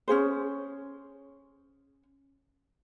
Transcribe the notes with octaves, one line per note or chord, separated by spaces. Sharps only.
C#4 D#4 G#4 C5